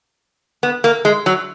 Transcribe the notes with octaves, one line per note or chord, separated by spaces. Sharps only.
B3
A#3
G#3
F#3